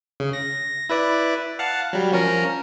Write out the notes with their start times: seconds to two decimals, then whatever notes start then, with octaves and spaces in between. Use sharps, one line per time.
0.20 C#3
0.33 A#6
0.89 E4 B4 D5
1.59 F5 F#5 A5
1.93 F#3 G3
2.12 F3 C#4 A#4